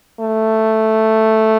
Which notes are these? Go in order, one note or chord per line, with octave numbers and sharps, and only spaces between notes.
A3